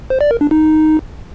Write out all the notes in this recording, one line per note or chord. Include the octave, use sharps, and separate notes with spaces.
C5
D5
A#4
D4
D#4